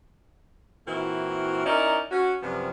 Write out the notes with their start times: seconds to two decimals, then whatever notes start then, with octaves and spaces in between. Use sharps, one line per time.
0.87 A#2 E3 C4 E4 F#4 A#4
1.65 C#4 D#4 E4 A#4 D5 D#5
2.11 C#4 F#4
2.42 F#2 C3 F3 G3 B3